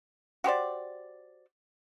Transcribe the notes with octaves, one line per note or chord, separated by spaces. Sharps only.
F#4 G4 C5 D5